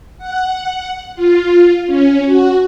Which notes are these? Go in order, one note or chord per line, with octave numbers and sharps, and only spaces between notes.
F#5
F4
C#4
F#4